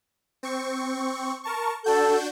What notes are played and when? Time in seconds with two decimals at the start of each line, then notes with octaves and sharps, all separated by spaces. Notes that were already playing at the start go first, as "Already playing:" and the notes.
0.43 C4 C#6
1.44 A#4 A5 C#6
1.84 D4 F#4 A4 G6